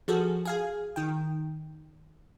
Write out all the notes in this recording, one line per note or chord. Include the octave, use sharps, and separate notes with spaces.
F3 F#4 G#4 A4
G#4 F5 G#5
D#3 G5